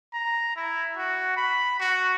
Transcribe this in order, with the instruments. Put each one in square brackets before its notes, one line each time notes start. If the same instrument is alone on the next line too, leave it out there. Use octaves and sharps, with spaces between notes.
[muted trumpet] A#5
E4
F#4
B5
F#4